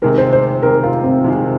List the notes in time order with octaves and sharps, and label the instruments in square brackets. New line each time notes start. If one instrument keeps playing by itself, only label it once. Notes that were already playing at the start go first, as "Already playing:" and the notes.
[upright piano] C3 D#3 G#3 [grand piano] A#4
[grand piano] C5
C5
[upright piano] C3 D#3 G#3 [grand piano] A#4
[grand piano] F4
C4
[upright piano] C3 D#3 G#3